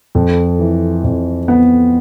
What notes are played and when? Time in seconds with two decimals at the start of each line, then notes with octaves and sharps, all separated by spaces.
0.15 F2 A4
0.59 E3
1.04 F2
1.48 B3